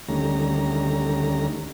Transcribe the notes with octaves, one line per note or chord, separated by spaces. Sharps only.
D2 D#3 G3 A3 C#4 A#5